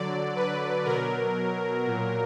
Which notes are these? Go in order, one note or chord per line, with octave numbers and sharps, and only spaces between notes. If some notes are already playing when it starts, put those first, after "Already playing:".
Already playing: D3 F#3 D5
B4
B2 F#3 A#4
A#2 F#3